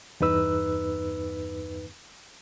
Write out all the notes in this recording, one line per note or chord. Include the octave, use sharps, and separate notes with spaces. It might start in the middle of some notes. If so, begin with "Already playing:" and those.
E2 G2 D#4 B4 E6